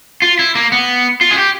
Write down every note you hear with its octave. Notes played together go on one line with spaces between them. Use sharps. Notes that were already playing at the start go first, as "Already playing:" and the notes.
F4
E4
A#3
B3
F4
G#4
G4